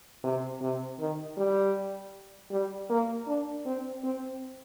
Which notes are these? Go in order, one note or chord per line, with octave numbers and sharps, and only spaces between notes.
C3
C3
D#3
G3
G3
A#3
D4
C4
C4